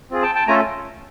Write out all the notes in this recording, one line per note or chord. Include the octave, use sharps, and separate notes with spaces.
C4 F4 G#4
G5 A5
G5 A5
A3 C#4 F4 A4 G#5 A#5